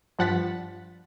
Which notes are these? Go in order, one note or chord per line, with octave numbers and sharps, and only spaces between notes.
G2 F3 F#5 F#6 A6 B6